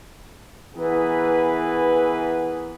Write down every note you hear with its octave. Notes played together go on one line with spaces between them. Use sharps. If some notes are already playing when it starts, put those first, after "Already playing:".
E3 B3 G#4 A#4 B4